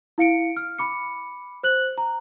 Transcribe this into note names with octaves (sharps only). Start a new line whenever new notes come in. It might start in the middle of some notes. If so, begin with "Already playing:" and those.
E4 F5 C#7 D7
F6
B5 D6 C#7
C5 F#6 F#7
A#5